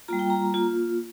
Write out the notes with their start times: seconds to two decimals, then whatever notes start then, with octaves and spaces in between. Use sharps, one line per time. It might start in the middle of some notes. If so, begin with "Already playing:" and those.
0.08 G3 A#3 F4 A#5
0.19 G5
0.30 A#5
0.54 A#3 F4